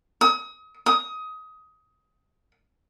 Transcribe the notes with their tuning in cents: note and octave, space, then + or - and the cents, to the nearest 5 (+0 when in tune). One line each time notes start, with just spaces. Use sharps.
D#6 +35
D#6 +20